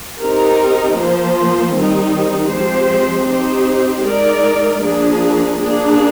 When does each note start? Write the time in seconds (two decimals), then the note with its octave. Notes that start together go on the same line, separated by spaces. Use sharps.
0.21 C4 D#4 G4 A#4
0.97 F3 A#3 F4 C5
1.74 D#3 G3 C4 D#4
2.50 F3 G#3 C4 G4 C5
3.27 C4 D#4 G4 C5
4.05 G#3 D#4 A#4 D5
4.81 F3 A#3 D4 G#4
5.58 A#3 D4 G#4